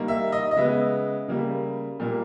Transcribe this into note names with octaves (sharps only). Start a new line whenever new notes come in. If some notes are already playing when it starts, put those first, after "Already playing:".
Already playing: D#3 G3 A#3
E5
D#5
D#5
C#3 G#3 B3 E5
C#3 G3 A#3
A#2 G3 A#3